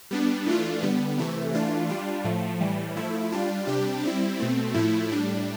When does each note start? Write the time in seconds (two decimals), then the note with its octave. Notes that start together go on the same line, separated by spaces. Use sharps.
0.11 G3 B3 D4
0.46 E3 A3 D4 F4
0.83 D3 G3 B3
1.18 C3 E3 A3
1.54 E3 A3 D4 F4
1.89 G3 D4 F4
2.24 A2 F3 A3
2.61 A2 E3 G3
2.97 F3 A3 E4
3.32 G3 D4 F4
3.67 C3 G3 D4 G4
4.03 G3 C4 E4
4.39 B2 A3 C4
4.74 A2 F3 A3 E4
5.09 A2 G3 D4